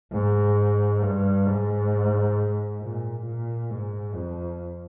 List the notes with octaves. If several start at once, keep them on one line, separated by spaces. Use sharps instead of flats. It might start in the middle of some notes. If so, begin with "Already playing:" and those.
G#2
G2
G#2
A#2
A#2
G#2
F2